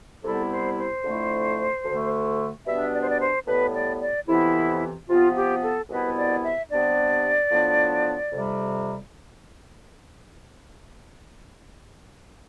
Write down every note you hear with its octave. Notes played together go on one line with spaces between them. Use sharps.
C2 C3 G3 B3 E4 A4
C5
C5
F2 D3 A3 E4
D2 D3 A3
B2 G3 B3 D4 E5
D5
C5
D5
C5
A2 G3 B3 B4
D5
D5
F2 C3 E3 B3 E4
C3 F3 B3 F4
G4
A4
C2 B2 B3 E4 B4
D5
E5
C3 G3 B3 D4 D5
A2 F3 B3 D4
F2 C3 G3